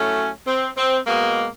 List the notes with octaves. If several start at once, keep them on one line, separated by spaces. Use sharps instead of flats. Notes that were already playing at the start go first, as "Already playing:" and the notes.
Already playing: A2 F#3 A3 C#4
C4
C4
B2 G#3 A#3